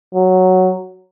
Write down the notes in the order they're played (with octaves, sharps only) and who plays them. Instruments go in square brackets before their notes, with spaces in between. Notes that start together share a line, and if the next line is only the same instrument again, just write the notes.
[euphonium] F#3